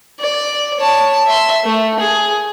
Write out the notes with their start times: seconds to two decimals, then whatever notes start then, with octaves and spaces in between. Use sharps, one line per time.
0.20 D5
0.80 C#5 A5
1.25 E5 C6
1.64 A3
1.99 G#4